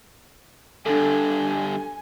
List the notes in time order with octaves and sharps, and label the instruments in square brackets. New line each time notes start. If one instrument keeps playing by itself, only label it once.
[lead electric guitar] G2 D3 [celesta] D4 A4 [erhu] G#5